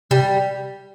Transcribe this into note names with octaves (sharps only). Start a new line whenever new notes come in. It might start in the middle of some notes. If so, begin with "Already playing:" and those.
C3 G3